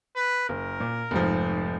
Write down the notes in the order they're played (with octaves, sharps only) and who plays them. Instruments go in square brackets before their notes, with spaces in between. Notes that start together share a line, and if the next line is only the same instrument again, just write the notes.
[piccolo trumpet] B4
[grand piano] F#1 [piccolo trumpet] A#4
[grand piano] A#2
F1 G#2 F3